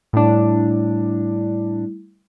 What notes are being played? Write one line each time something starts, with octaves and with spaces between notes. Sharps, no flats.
A2 G3 A3 D4 E4